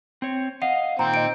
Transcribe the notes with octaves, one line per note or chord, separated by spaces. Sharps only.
C4 C#5
D#5 F5 F#5
A#2 D#3 C4 A#5
D#5 C#7 D7